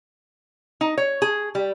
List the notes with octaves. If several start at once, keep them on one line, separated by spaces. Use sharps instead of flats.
D#4
C#5
G#4
G3